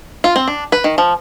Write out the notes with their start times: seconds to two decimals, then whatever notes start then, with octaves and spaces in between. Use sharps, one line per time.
0.24 F4
0.36 C4
0.48 D4
0.72 B4
0.84 D#3
0.98 F3